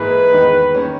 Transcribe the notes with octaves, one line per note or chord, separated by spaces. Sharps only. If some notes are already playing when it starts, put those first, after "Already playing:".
Already playing: G#2 E3 A#3 E4 G#4 B4
E2 D#3 G#3 D#4
D#3 A#3 C#4